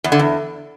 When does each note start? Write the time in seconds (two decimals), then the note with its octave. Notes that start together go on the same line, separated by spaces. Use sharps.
0.04 E2
0.12 D3
0.19 E2